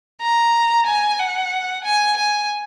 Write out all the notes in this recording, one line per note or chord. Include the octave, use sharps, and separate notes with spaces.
A#5
G#5
F#5
G#5
G#5